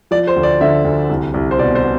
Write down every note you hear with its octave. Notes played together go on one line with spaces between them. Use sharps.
F3 D5
C5
D2
D5
D3 E5
D2
C2
C2
C5
B2 D5
C5
B2